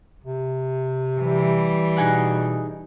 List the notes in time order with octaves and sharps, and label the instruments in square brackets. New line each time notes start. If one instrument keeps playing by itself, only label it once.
[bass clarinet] C3
[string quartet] E3 G3
[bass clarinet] B2 [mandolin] D#4 G#4 F#5